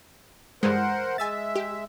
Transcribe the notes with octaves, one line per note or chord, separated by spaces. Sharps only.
G2 E3 G#3 A#4 C5 F#5
G#3 E5 G#5 E6 A6
G4